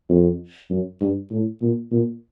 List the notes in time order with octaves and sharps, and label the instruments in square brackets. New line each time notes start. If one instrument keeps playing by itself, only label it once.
[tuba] F2
F#2
G2
A2
A#2
A#2